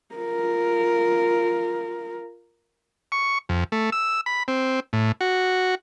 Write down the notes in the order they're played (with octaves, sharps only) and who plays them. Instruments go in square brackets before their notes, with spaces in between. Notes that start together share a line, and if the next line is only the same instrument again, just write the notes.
[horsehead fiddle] F4 A#4
[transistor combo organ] C#6
F2
A3
E6
B5
C4
A2
F#4